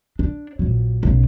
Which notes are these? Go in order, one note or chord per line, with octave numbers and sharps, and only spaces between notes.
D4
A#1 F#3
B1 C#3